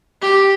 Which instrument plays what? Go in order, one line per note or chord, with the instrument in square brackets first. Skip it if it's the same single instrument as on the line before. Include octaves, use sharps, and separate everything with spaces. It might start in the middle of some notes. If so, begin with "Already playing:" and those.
[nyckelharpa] G4